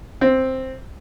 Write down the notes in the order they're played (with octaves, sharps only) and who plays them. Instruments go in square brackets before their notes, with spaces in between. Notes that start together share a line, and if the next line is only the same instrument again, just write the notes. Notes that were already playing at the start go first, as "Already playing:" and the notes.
[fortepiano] C4